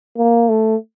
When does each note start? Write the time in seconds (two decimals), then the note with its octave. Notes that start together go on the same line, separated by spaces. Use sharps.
0.18 A#3
0.49 A3